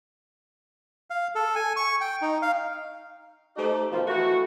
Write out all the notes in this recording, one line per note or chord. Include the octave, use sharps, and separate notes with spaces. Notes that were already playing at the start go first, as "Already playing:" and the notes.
F5
A4
G#5
C#6
G5
D#4
F5
A3 D#4 G4 C5 D#5
B2 D#3 F3
E3 A3 F#4